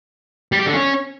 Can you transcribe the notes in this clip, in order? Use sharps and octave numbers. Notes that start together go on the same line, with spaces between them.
G3
G4
D3
C#4